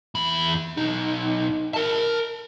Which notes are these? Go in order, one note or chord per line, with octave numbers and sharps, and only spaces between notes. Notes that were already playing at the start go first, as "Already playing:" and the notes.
E2 B5
B1 D#4
A#4 A5